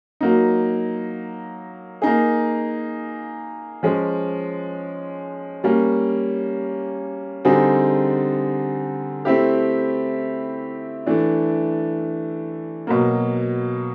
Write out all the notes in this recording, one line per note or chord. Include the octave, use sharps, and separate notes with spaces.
F#3 A#3 D#4
A#3 D#4 G#4
F3 G#3 C#4
G3 A#3 C#4
D3 G3 C4 D#4 G#4
A3 C4 E4 G4
E3 A3 D4
B2 F#3 A#3